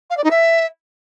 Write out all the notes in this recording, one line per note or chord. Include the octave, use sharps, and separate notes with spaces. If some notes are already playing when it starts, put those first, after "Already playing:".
F5
D5
D#4
E5